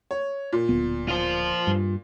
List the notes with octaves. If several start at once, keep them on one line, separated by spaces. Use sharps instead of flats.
C#5
A#2
D1 B3
F4 C5
G2